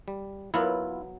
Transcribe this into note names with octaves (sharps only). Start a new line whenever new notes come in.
G3
F#3 B3 E4 F4